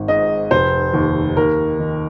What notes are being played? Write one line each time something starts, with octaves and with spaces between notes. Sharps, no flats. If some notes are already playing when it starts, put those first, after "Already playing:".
Already playing: G#1
G#2 D#5
F1 C5
D#2
D#2 A#4
D#3